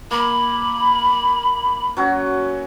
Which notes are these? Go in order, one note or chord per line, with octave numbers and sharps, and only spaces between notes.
A#3 B5
F#3 C#4 F#4